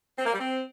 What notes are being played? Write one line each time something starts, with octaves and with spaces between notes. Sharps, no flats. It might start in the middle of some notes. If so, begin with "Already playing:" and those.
C4
A#3
G3
C4